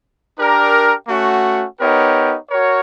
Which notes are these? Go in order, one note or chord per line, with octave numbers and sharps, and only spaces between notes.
D4 G4 A#4 D5
A3 C#4 F#4
B3 D#4 G4 A#4 C#5
F#4 A#4 C#5